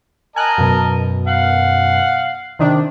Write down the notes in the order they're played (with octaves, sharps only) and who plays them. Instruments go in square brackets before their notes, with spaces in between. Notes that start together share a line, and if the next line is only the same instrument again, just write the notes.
[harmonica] A#4 D#5 A5 [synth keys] G#5 F#6
[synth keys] F#2 B2
[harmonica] F5 F#5
[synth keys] C3 D#3 D4